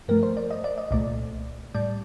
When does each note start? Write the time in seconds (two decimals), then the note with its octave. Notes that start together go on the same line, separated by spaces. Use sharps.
0.08 G2 F3 A3 A#4
0.23 C5
0.37 D5
0.51 D#5
0.64 D5
0.78 D#5
0.91 C2 A#2 A3 D5
1.74 A2 G3 D5